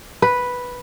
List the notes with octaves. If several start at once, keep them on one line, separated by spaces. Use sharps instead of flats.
B4